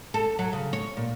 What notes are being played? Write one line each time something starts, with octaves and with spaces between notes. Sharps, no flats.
A4
F#3
C#3
C#5
A#2